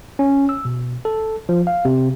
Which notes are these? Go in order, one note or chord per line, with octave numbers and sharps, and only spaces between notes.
C#4
E6
B2
A4
F3
F5
C3